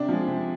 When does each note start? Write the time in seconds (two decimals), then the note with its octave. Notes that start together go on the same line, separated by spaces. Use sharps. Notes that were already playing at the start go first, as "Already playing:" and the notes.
Already playing: C3 D4 D5
0.09 F3 G#3
0.27 C3